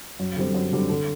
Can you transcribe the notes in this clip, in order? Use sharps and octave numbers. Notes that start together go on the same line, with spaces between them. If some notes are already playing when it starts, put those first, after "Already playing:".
F#2
D3 G3 C4
F#2
D3 G3 C4
D3